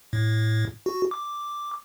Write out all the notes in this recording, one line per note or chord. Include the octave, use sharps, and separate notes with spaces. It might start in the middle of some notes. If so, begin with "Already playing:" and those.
A2
F#4
D6